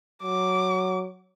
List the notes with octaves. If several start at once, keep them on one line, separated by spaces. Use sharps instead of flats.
F#3 D6